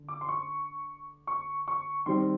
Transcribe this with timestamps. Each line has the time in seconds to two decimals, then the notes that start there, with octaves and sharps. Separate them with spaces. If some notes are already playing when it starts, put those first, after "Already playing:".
Already playing: D3
0.08 D6
0.21 C6
0.29 C#6
1.27 C#6
1.68 C#6
2.06 D#3 G3 C4 C6